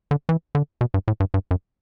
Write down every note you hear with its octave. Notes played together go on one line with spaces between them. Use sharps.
D3
E3
D3
B2
G2
A2
G2
G2
F#2